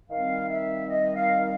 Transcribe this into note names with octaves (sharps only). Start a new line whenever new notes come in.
D#3 G3 C4 F5
E5
D#5
F5
F5